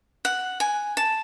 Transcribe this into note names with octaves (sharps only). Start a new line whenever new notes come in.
F#5
G#5
A5